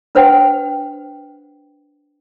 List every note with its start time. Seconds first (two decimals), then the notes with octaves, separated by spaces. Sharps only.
0.15 D4 B4 C5 F#5 G5